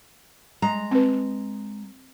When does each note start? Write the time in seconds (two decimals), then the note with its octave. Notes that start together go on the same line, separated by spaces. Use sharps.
0.62 G#3 A#5
0.91 C4 B4